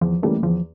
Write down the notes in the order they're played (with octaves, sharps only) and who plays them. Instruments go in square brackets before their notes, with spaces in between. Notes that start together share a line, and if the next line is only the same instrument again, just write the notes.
[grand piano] E2 [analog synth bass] F3
[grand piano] E3 G3 A#3 C#4 [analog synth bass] A3
[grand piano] E2 [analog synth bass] F3